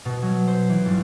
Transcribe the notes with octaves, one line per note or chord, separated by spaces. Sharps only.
B2
F#3
C5
E3
G1